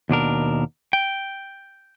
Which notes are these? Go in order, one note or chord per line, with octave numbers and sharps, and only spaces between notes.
D#2 B2 D4 A#4
G5